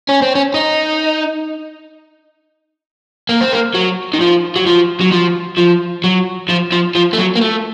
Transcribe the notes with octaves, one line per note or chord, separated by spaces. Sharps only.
C#4
C4
C#4
D#4
A#3
C4
A#3
F#3
D#3
F3
F#3
F3
F#3
F3
F3
F#3
F3
F3
F3
A3
F#3
A#3
A3